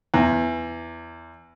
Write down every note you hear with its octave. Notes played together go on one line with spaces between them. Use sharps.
E2